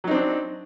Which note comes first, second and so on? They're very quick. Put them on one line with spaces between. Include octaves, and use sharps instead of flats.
F#3 D#4 C4 D4